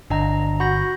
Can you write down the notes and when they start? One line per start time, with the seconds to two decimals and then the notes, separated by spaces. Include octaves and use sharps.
0.10 G1 D4 D#5 A#5
0.60 F#4 B5 G6 A#6